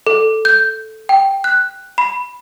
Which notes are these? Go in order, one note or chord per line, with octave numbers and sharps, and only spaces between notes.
A4
G6
G5
F#6
B5